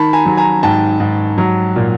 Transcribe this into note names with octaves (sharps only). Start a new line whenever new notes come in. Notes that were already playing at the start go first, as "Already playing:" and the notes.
Already playing: D#3 A5 B5
G#5 A#5
F#3
G#5 A#5
G#2 G5 A5
G#2
F#3
A#2